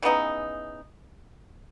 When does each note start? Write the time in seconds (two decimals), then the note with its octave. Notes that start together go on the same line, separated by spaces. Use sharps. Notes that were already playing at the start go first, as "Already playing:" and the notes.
0.02 C#3 E3 B3 D#4